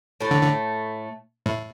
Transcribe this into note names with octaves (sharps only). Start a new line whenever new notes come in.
A2 A3
D3
D3
A2